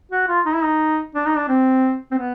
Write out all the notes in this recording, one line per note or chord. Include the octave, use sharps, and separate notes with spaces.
F#4
F4
D#4
E4
D#4
D4
D#4
D4
C4
C4
B3